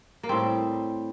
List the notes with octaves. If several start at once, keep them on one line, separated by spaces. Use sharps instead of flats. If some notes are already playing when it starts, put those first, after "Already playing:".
A#3
A2 G3 C4